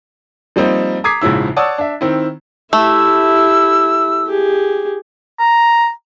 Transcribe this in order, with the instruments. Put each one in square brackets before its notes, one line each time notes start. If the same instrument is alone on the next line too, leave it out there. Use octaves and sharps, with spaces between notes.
[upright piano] F3 G3 A#3 C4 D#4
A#5 D6 D#6 G#6 B6 C7
A#1 G#2 C#3 F3 E4 E6
C#5 D5 F#5 A5 D#6 E6
D4 E5
D#3 C4 E4
[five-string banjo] A3 [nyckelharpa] E4 G4 [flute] E6
[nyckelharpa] G4 G#4
[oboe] A#5